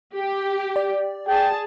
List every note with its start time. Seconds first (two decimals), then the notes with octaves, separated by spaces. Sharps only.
0.16 G4
0.76 D5
1.28 G#4 G5 A5